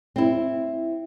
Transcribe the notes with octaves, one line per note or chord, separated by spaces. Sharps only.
C4 E4